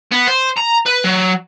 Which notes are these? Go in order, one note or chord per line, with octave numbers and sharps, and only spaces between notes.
B3
C5
A#5
B4
F#3